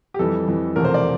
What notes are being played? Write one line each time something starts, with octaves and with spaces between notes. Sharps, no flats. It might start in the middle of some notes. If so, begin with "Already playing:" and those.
G4
F2 E3 G3 A4
F2 E3 G3
E1 E2 C3 F3 A3 A#4
C5
D5